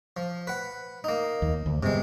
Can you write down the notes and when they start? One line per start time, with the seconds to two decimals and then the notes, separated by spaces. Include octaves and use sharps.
0.17 F3
0.47 B4 F#5
1.04 A#3 D#4
1.42 D#2
1.66 D2
1.83 G2 C3 G#3 B3